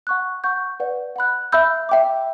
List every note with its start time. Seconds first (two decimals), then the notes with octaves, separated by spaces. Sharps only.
0.07 F#5 C#6 F#6
0.44 F#5 C#6 G6
0.80 B4 D5 F#5
1.16 F#5 B5 F#6
1.52 E5 B5 E6 G6
1.89 E5 G5 D6